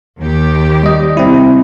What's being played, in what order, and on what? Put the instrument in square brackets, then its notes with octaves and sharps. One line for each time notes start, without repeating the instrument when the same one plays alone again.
[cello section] D#2 D#3 G4
[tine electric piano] G3 D#5
[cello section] C3 G3 [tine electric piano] C4 E4